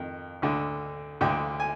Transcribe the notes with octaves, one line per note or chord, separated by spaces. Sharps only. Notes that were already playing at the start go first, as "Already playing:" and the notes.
Already playing: F2 D#3
D2 D3
D2 D3 G5
G#5